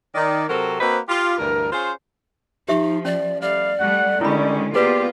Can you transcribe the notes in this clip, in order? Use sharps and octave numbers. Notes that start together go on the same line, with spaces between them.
D#3 D5
C3 F#3 C4 F#4 A4 A#4
A#3 C4 F#4 B4 C5 D#5
F4 G4
D2 G2 E3 A#4
C#4 F4 G#4 C5
F3 D#4 G4 E5 C#6
C#4 D5
G3 A3 D5 F5
G3 A3 F#5
D3 D#3 G3 G#3 C#4 E4 B5
A#3 B3 F4 G4 G#4 B4 D5